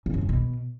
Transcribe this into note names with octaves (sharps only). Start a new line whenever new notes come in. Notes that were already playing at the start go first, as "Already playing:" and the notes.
C#3
F#2
A2
B2